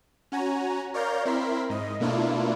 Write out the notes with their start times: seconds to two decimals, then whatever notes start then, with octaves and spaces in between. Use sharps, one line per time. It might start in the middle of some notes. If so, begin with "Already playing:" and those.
0.32 C#4 F#4 G#5 A#5
0.94 A#4 C#5 D5 F5 A#5 G6
1.25 C4 E4 A#4 C6 B6
1.69 G#2 D#5
2.00 B2 A3 A#3 D4 E4 F4